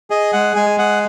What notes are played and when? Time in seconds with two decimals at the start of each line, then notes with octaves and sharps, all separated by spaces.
0.10 G#4 D#5
0.33 G#3 F#5
0.56 G#3 G#5
0.78 G#4 F#5